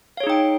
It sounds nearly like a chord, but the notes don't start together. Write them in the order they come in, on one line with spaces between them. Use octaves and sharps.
F5 C#5 G#4 D#4 G5